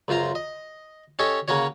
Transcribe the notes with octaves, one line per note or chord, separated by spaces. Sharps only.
C#2 F#2 F4 C5 A#5
D#5
C#4 G4 A4 C#5 D#5
C#3 A#3 C#4 F#4 C#5